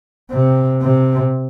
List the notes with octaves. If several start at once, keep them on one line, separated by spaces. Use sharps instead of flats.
C3
C3